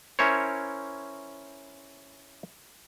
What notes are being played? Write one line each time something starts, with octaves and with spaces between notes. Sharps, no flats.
C#4 E4 A#4 C5 C#5